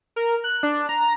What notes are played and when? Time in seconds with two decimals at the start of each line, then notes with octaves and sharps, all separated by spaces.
0.16 A#4
0.44 F#6
0.63 D4
0.89 A#5